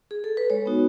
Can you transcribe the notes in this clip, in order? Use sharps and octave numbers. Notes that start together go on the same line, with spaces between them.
G#4
A4
B4
G#3 C#5
B3 D#4 F#4